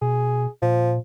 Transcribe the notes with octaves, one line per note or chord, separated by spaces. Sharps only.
B2 G#4
A#2 F3